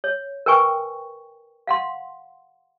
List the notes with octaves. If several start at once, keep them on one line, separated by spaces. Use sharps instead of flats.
C#5
A#4 B4 G5 G#5 C#6
F5 F#5 C6